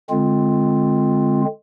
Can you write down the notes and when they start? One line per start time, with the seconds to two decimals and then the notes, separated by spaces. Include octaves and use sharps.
0.10 D3 G#3 C4 F4